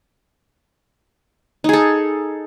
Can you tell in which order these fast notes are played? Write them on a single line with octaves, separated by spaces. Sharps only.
D#4 G#4 A4